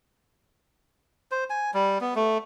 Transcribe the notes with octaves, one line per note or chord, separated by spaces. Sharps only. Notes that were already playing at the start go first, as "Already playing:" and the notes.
C5
G#5
G3
B3
A3